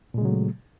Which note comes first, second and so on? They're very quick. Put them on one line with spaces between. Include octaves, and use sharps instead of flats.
A#2 G#3 C#3 F#3 A3